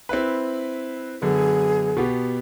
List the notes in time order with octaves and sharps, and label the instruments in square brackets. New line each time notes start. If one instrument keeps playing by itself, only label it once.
[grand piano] C4 E4 B4
[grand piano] F#2 D3 B3 [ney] G#4
[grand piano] B2 B3 G4